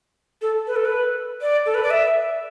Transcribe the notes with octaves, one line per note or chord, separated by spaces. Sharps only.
A4
B4
A4
B4
D5
A4
B4
D5
E5